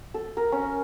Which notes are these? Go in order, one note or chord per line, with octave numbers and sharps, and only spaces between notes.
A4
A#4
C#4